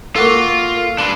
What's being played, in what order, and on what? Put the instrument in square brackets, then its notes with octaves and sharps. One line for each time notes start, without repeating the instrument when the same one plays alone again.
[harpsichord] A#3 F#4 A4 [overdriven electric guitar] F4
[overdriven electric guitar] D4 B4 [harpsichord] C6